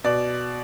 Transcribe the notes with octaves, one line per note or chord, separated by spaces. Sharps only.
B2 D5